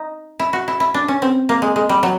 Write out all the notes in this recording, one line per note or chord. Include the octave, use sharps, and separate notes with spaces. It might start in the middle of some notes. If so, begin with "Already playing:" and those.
Already playing: D#4
E4
F#4
E4
E4
D4
C#4
C4
A#3
G#3
G#3
G3
F#3